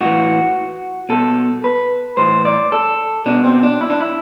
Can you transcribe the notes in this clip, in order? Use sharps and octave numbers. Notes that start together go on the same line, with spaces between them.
A2 E3 F#4
B2 A4
B4
A2 E3 C5
D5
A4
B2 D4
C4
D4
E4
D4
E4